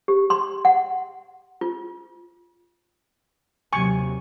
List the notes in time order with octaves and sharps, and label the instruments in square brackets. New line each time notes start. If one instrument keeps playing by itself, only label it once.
[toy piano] G4
C6
F#5
F4
[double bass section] D#2 C3 F#3 [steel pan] G#5 C#6